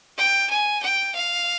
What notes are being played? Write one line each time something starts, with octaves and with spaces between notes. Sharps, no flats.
G5
G#5
G5
F5